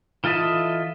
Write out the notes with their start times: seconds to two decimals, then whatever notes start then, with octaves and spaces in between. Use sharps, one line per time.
0.24 E3 F4 A4 D#5 E5